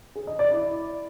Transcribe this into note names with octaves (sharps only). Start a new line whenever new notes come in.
G#4
D#5
D5
E4